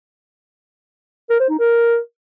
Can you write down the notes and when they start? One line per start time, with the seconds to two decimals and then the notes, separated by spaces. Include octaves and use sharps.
1.30 A#4
1.40 C5
1.49 D#4
1.59 A#4